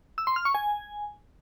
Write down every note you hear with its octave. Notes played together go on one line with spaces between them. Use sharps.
E6
C6
F6
C#6
G#5